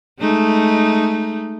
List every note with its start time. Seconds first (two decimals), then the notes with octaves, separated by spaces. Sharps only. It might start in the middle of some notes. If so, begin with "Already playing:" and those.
0.19 G#3 A3 D#4